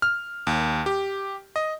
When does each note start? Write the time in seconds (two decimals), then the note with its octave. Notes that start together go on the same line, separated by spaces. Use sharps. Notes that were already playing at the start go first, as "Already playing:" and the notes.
0.02 F6
0.47 D#2
0.86 G4
1.56 D#5